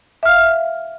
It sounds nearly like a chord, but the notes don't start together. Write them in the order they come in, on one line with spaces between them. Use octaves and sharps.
E5 F6 F5